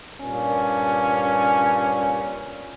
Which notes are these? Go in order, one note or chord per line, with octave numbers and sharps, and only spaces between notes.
G2 A#2 C#4